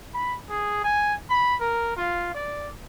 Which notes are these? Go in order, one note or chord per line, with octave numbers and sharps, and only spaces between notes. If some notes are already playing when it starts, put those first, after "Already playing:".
B5
G#4
G#5
B5
A#4
F4
D5